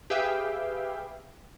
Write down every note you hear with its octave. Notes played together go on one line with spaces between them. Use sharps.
G4 G#4 B4 E5 F5 G5